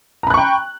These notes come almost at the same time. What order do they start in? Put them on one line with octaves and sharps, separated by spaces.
A#5 B5 F#6 C#6 G5